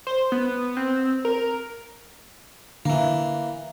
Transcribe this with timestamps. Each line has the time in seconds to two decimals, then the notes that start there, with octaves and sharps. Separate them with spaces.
0.07 C5
0.32 B3
0.77 C4
1.25 A#4
2.85 D3 E3 A#3